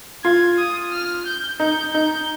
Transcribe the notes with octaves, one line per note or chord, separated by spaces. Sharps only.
F4 G#6
D#6
F6
G6
D#4 G6
D#4 G6